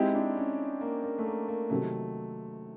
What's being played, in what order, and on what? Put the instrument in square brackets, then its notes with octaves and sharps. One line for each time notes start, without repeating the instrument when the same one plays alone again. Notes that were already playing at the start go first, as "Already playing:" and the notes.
Already playing: [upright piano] G#3 C4 E4 G4 [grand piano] D#4
[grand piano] D4
C#4
A#3
A#3
A3
A#3
A#3
[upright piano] C3 D#3 F#3 [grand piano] A3